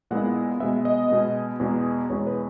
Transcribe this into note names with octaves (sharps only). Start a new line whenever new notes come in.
A#2 G#3 B3 E4 F#5
B2 G#3 B3 E5
D#5
B2 G#3 B3
E2 B2 G#3 B3
E2 B2 G#3 B3 C#5
B4